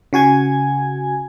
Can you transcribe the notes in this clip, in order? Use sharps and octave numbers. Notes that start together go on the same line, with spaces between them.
C#3 F#4 G#5 G#6